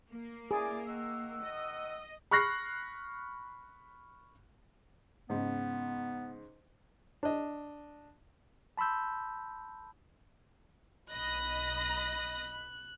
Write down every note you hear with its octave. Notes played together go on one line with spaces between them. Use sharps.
A#3
E4 G#4 D5 D6
D#3 F#5 E6
D#5
B5 C#6 F6 F#6 A#6 C7
G#2 C#3 B3
D4 D#5
A5 B5 C6 E6 G6
B1 D#5 B5 F#6 A#6